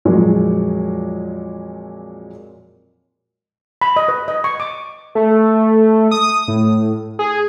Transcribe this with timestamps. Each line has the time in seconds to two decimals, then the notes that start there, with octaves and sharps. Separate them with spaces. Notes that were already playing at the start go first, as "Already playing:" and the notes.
0.05 F2 A#2 F#3 G#3
3.82 B5
3.96 D#5
4.08 B4
4.28 D#5
4.44 C#6
4.60 D6
5.15 A3
6.11 D#6
6.48 A2
7.19 G#4